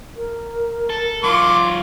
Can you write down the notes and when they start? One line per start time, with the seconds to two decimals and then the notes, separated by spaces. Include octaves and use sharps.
0.16 A#4
0.90 A4
1.23 F#3 F4 C6 D6